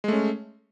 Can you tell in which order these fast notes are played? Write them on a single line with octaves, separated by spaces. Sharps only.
G#3 A3 C#4